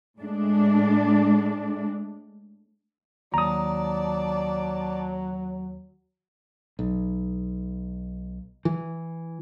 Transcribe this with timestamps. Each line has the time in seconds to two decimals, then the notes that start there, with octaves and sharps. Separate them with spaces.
0.19 A2 G#3 D4
3.34 D#2 F#3 D5 A5 A#5 D#6
6.79 B1
8.65 E3